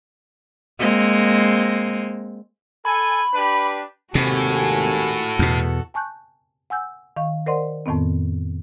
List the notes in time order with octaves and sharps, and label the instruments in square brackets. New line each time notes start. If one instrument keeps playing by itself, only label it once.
[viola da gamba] G#3 A#3 C4
[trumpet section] A4 G#5 [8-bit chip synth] B5
[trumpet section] D4 G4 B4
[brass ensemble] G#1 D#2 G#5 [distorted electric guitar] A2 [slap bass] C3 [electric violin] F#4 A4
[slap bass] E2 B2
[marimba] G#5 A5 C#6 F#6 G6
F#5 G#5 E6 G6
D#3 D#5 F5 C#6
A#4 C5 D5 D#5 F#5 C6
F2 A2 D#3 B3 C4